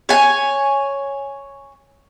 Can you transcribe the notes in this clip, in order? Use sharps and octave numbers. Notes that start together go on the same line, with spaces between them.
C#5 G#5